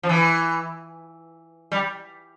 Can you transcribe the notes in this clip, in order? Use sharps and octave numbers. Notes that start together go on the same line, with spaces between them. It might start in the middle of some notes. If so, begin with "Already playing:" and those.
F3
E3
G3